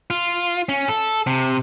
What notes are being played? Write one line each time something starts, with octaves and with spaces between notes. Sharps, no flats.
F4
C#4
A4
C3